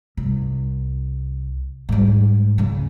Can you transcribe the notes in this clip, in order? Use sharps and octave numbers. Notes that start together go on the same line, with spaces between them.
C2
G#2 G3
D2 C#3